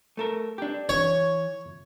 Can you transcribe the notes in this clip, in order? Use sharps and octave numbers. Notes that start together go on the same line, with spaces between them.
A3 A4 A#4
D4 G4
E3 C#5